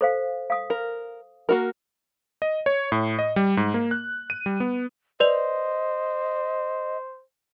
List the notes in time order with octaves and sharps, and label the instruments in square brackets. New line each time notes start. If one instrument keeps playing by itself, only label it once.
[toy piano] A4 C5 F5
F5 D#6
[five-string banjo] A#4
A#3 F#4 A#4
[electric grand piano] D#5
C#5
A2
D#5
G3
G#2
A#3
F#6
D#7
G3
B3
[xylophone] B4 D5 F7 [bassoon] C5 [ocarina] D#5